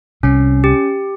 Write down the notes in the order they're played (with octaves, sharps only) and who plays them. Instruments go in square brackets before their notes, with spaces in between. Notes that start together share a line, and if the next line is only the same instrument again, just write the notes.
[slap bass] C2 C3 [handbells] C#4
[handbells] G4